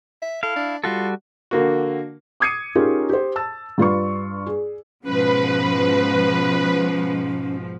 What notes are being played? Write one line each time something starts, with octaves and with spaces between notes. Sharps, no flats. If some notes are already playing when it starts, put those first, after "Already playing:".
E5
E4 A4 F5
D4
G3 F4 F#4 A4
D3 A#3 F#4
D6 D#6 G#6 C7 C#7 D#7
C#4 D#4 F4 G4 G#4 A#4
G4 C5
A5 E6 A6
G2 F4 B4 C#6
G#4
G#2 B2 F3 C#4 B4